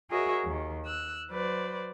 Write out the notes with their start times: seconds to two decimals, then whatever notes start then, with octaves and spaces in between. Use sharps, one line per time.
0.11 F#4 G#4 A#4 C#5 D#5 E5
0.45 D#2 D#3
0.86 E6 F#6
1.30 F#3 B4 C5 D5